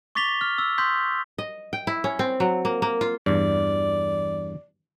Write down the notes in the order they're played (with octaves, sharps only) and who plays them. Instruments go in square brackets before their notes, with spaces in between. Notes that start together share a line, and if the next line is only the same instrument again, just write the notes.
[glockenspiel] C#6 D6 A6 B6 F7 G7
F6
E6
C6 D#6 E6 G6 B6
[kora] D#5
G5
E4
C#4
C4
F#3
A#3
A#3
F4
[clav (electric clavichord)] E2 G2 [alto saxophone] D5